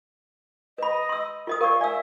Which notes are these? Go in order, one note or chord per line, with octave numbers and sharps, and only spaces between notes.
B4 D#5 B5
C6 E6
F4 A#4 D#5 D#6
A#4 D5 F5 C#6
D5 E5 G#5 E6